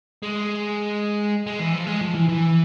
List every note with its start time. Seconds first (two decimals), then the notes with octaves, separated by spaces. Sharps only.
0.23 G#3
1.46 G#3
1.59 E3
1.73 F3
1.87 G#3
2.01 F3
2.15 E3
2.29 E3